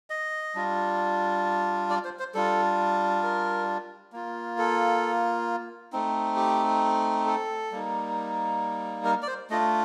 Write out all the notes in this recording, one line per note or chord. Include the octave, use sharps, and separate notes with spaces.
D#5
G3 D4 F4
D5
C5
C5
G3 D4 F4 A4
A#4
A#3 F4
A4
A3 C4 D#4
G4
A4
G3 A#3 D#4
A#4
D5
C5
A3 D4 F4 D#5